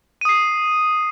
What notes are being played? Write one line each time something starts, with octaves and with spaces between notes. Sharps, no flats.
D#6 C7 D#7